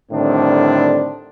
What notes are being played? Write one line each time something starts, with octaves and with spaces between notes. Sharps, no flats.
A2 D3 D#3 G3 C4 D4